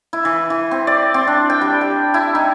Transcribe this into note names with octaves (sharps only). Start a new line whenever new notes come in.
E4
E3
E3
C4
D5
C4
D4
G5
G3
G5
E4
D#4